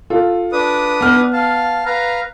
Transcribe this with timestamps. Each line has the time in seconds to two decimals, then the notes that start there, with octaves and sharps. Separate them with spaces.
0.10 F4 A4
0.52 D4 B4 D#6
1.01 B3 F6
1.33 F5 A5
1.85 B4 F5 A#5